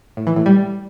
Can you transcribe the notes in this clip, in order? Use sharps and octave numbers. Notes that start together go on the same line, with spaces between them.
A2
E3
A2
G3